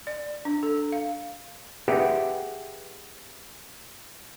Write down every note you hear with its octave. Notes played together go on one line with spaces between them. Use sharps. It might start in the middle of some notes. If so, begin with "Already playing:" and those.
D5
D4
A4
F5
G4 G#4 B4 E5 F#5 G5